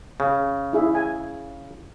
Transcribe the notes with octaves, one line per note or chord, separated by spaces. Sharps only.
C#3
E4 G#4 E5
G#5